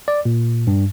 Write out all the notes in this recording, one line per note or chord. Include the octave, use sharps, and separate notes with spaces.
D5
A#2
G2